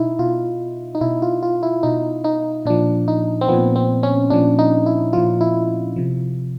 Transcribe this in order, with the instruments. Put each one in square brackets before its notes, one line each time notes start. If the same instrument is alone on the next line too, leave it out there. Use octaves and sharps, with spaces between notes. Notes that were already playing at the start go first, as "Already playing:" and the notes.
Already playing: [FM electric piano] B2 D#4 E4
B2 F4
D#4
B2 E4
F4
F4
E4
B2 D#4
D#4
A#2 F3 D4
D#4
C4
A#2 F3 B3
C4
C#4
A#2 F3 D4
D#4
E4
A#2 F3 F4
E4
C3 F3